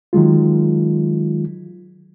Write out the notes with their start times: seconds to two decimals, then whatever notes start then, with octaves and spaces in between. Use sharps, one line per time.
0.13 D#3 F#3 G#3 F4